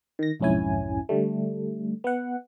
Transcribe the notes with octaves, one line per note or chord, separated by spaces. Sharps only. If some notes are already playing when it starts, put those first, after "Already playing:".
D#3 A#6
B1 F2 G#2 C#4 E4 G#5
D3 G3 A3
B3 F#5